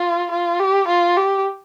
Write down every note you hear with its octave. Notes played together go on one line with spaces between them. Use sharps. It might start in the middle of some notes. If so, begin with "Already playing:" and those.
Already playing: F4
F4
G4
F4
G4